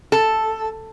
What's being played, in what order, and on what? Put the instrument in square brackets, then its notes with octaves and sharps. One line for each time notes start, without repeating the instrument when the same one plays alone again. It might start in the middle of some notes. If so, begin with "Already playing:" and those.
[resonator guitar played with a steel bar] A4